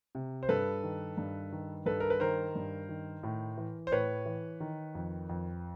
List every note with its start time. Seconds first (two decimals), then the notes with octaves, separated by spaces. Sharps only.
0.15 C3
0.43 C5
0.49 G2 A4 B4
0.83 D#3
1.17 G2
1.52 D#3
1.86 G2 A4 B4
2.00 A#4
2.10 B4
2.20 D#3 A#4 C5
2.55 G2
2.89 D#3
3.23 A2
3.58 E3
3.87 C5
3.92 A2 B4 C#5
4.26 E3
4.60 D#3
4.95 F2
5.29 F2